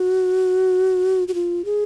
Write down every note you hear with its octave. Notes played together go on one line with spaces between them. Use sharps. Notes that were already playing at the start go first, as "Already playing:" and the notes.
Already playing: F#4
F#4
F4
G#4